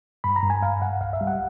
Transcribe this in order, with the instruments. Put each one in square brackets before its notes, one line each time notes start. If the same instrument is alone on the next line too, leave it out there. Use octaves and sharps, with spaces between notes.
[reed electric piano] G2 B5
A#5
G2
G#5
G2 F5
G2 F#5
C2 F5
E5
G3
F#5